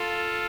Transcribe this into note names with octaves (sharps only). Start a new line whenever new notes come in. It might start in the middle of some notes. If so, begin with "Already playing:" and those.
Already playing: F4 A4